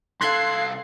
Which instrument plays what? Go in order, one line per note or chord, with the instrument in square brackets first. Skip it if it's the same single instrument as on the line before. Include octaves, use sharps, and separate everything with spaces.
[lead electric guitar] C2 F5 [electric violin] A4 C7 [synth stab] C6 F#6 G#6